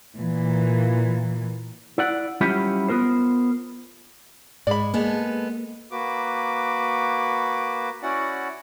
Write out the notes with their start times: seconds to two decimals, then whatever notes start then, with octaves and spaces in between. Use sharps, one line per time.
0.18 A#2 E3
1.98 E4 D5 F#5
2.41 F#3 G3 C#4 E4 F4 G4
2.89 B3 F4 A#4 C5
4.67 G#2 G#3 D5 B5
4.94 G#3 A#3 B3 A4
5.91 A#3 F#4 B4 D6
8.03 C#4 E4 F#4 D5 F#5